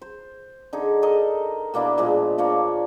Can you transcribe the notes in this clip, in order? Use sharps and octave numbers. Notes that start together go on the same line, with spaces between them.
C5
D3 D#4 G#4
A4 A#4 D#5
B2 A#3 D4 E4
A#2 F3 G#3 B3
F3 A#3 D4 C#5